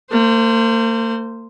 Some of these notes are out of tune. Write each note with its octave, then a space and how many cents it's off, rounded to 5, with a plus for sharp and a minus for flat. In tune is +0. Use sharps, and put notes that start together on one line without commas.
A#3 -40 C5 -5